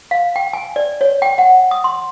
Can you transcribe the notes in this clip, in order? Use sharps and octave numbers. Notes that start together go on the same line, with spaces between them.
F5
G5
G#5
D5
C#5
G5
F#5
D#6
C6